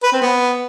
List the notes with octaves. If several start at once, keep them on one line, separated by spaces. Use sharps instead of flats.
B4
C4
B3